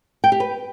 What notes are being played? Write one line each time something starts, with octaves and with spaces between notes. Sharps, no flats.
G5
G4
B4